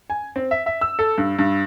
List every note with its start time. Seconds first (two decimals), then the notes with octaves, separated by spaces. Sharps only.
0.10 G#5
0.36 C4
0.51 E5
0.66 E5
0.81 E6
0.99 A4
1.18 G2
1.39 G2